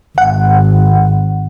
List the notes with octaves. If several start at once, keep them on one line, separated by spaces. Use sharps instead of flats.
G#1 F#5